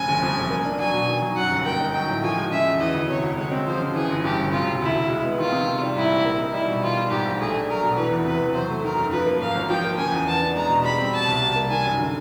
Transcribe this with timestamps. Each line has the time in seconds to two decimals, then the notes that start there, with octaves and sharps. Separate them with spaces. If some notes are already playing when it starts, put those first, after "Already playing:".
Already playing: F1 C#3 G#5
0.08 G1
0.22 F2
0.36 G1
0.50 A#3
0.65 D4
0.79 F#3 G#5
0.94 B2
1.08 D#3
1.22 F#3
1.37 F#2 F#5
1.51 G1
1.65 A#3 G5
1.80 D#4
1.94 F#3 G5
2.09 A2
2.23 F3 G#5
2.37 G#3
2.51 C#3 E5
2.66 E2
2.80 E3 D#5
2.94 D2
3.09 C3 C#5
3.23 D2
3.37 G#3 C#5
3.52 C4
3.67 F3 C5
3.80 C#3
3.95 E3 G#4
4.10 G1
4.24 G2 G4
4.38 G1
4.52 C3 F4
4.67 E1
4.81 D2 E4
4.96 E1
5.10 G#3
5.24 B3
5.38 D#3 F4
5.53 C3
5.67 D#3
5.81 G3
5.96 G#2 E4
6.11 A#1
6.25 A#3
6.40 D#4
6.53 G3 E4
6.68 B2
6.83 D#3 F4
6.97 G3
7.11 G#2 G4
7.25 A#1
7.39 A3 G#4
7.54 D4
7.69 F#3 A#4
7.83 B2
7.97 E3 B4
8.11 E2
8.25 C3 B4
8.41 E2
8.54 F#3 C5
8.68 A3
8.84 D#3 A#4
8.97 F#2
9.12 F3 B4
9.27 A#3
9.41 G#2 F5
9.55 G#1
9.69 F3 G5
9.84 A#3
9.98 C#3 G#5
10.12 E2
10.27 B3 A5
10.41 D4
10.56 G#3 A#5
10.69 B2
10.84 G3 B5
10.98 C4
11.13 B2 A5
11.28 C2
11.42 G3
11.56 A#3
11.70 D#3 G#5
11.84 F#2
11.99 D3